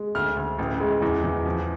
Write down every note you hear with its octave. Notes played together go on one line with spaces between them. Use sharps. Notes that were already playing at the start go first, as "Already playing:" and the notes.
Already playing: G#3
D2 F6
D2
A1
G#3
E2
E2
F3